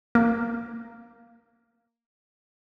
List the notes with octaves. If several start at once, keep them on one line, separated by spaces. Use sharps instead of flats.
A#3